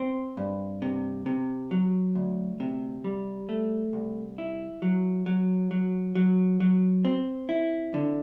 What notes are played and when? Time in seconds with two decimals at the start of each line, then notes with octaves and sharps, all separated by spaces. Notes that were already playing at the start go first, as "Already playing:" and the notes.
Already playing: C4
0.37 G2
0.82 C3
1.26 C3
1.71 F#3
2.15 D2
2.60 C3
3.04 G3
3.49 A3
3.93 C2
4.38 E4
4.82 F#3
5.26 F#3
5.71 F#3
6.15 F#3
6.60 F#3
7.05 C4
7.49 E4
7.94 D3